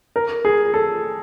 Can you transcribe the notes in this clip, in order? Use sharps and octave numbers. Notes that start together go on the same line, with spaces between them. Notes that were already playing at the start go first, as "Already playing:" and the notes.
A#4
G#4
A4